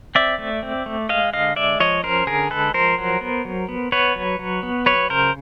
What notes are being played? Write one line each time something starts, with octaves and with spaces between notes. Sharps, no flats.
C4 D5 E5
A3
C4
A3
G#3 D#5 F5
D3 D#5 F5
G#3 D5 E5
F3 C#5 D#5
C#4 A#4 C5
D3 G#4 A#4
G#3 A4 B4
F3 A#4 C5
F#3
B3
F#3
B3
B3 B4 C#5
F#3
F#3
B3
F#3 B4 C#5
C#3 A#4 C5